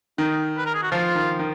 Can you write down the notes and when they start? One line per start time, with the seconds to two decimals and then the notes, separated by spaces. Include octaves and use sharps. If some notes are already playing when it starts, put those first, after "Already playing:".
0.18 D#3 D#4
0.58 B4
0.66 A#4
0.75 G#4
0.83 F#4
0.91 F3 F4
1.15 D#3
1.39 D#3